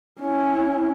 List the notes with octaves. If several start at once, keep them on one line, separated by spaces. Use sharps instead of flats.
C#4 E4